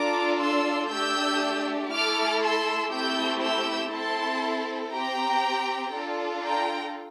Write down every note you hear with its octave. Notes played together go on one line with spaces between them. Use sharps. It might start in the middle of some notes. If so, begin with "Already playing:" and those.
Already playing: D4 F4 A4 A#5 D6
C6 E6
A3 D4 G4 E6 G6
A3 E4 A4 D6 F6
C6 E6
A3 C4 E4 G4 E6 G6
E6 G6
C4 E4 A4 A5 C6
C4 G4 G5 A#5
D4 F4 A4
G5 A#5